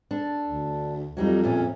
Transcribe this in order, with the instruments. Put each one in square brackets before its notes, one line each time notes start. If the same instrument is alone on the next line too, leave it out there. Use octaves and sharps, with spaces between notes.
[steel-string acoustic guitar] D4 A4
[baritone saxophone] D2
[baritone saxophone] F2 [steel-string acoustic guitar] F#3 G3 D#4
[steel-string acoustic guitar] E2 A#2 C#4